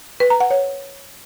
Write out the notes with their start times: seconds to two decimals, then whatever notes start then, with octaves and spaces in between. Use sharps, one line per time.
0.20 B4
0.30 A#5
0.40 F#5
0.51 C#5